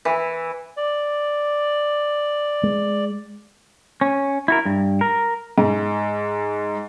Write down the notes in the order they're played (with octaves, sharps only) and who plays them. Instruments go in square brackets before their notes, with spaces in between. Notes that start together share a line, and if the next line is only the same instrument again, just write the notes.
[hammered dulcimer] E3
[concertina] D5
[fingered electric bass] G#3
[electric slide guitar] C#4
E4 F#4 A#4
G2
A#4
[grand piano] G#2